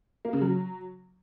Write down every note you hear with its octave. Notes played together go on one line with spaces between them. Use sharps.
A#3
C#3
F#3